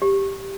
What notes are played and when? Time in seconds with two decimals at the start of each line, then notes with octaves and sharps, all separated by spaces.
0.02 G4